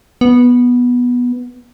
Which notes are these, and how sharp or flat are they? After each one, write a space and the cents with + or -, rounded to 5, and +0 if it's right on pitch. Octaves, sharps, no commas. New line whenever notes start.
B3 -10